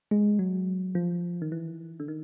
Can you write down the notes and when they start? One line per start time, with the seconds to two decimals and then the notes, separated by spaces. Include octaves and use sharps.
0.11 G#3
0.39 F#3
0.95 F3
1.42 D#3
1.52 E3
2.00 D3
2.08 D#3